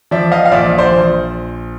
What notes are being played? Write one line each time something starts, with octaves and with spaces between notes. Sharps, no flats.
F3 D5 E5
D#5 F5
F5
A#1 D5 E5
C5 D5
A#1